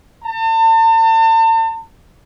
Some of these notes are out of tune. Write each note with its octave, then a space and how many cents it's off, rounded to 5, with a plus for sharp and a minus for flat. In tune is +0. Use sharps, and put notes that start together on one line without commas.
A5 +40